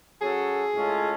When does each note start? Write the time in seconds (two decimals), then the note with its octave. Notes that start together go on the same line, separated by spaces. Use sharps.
0.21 F#3 C#4 F#4 G#4 A4
0.74 A2 G#3 C#4 F4 A4